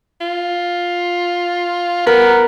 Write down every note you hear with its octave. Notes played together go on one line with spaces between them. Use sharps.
F4
B3 A#4